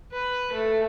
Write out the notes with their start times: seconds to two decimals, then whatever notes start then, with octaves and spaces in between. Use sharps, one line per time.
0.12 B4
0.53 A3